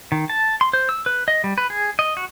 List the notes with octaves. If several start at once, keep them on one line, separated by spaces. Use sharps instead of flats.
D#3
A5
C6
C5
E6
B4
D#5
G3
B4
G#4
D#5
F#4